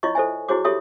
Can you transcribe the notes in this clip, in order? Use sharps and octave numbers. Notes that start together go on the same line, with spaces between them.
E4 F4 C#5 D#5 C#6
A4 C5 E5 G#5
E4 F#4 G#4 C5 C#5 D6
F4 G4 A4 C#5 E5 D#6